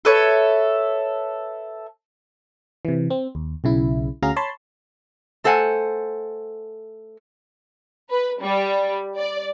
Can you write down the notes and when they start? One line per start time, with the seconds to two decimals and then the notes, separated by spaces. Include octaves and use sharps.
0.05 A4 B4 C#5 E5
2.85 C3 E3
3.10 C4
3.35 D#2
3.64 B1 C#3 E4
4.22 D2 C#4 F#4 G#4 F5 A#5
4.36 C#5 A5 B5 C6
5.44 A3 A4 C5 F#5 G#5
8.09 B4
8.40 G3
9.16 D5